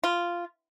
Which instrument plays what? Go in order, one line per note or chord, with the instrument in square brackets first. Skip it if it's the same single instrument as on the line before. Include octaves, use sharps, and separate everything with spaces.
[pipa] F4